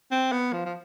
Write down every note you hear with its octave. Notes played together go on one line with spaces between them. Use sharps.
C4
B3
F3
F3